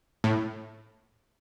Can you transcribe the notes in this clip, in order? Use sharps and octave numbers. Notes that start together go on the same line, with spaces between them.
A2